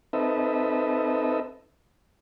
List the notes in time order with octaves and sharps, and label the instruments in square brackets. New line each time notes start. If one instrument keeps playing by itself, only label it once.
[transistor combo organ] C4 D#4 A4 B4 D#5 E5